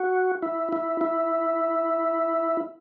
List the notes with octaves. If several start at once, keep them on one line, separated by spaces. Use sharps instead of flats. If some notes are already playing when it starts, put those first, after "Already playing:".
Already playing: F#4
E4
E4
E4